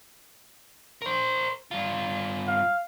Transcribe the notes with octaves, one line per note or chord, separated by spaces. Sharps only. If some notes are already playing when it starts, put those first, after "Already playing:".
A#4 C5
G2 F4
F5